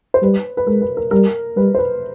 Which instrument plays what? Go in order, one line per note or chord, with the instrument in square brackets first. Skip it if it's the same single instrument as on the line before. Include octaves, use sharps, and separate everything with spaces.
[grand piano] C5
[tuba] G3 [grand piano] B4
[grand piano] B4
[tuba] G#3 [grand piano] A#4
[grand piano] B4
A#4
[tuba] G3 [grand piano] A#4
[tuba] G3 [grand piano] B4
[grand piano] C5
B4